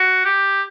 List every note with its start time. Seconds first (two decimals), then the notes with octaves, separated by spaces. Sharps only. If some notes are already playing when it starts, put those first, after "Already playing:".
Already playing: F#4
0.25 G4